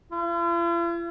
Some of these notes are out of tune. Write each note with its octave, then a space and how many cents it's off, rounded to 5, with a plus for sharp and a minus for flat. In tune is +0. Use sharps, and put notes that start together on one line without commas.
F4 -45